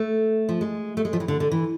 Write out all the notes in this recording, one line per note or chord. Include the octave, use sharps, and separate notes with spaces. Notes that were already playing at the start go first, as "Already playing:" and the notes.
Already playing: A3
F3
G#3
A3
G#3
F3
E3
D3
D3
E3